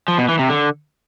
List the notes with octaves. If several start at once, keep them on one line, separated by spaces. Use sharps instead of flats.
F3
B2
E3
C3
D3